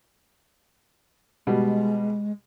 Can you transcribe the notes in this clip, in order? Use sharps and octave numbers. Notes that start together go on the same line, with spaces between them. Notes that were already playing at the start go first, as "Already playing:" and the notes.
B2 G3 G#3